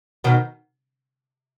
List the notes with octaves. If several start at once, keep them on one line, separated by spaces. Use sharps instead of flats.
B2 D#3